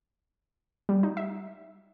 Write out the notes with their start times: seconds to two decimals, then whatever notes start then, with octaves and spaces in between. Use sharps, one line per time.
0.89 G3
1.03 D#4
1.17 E5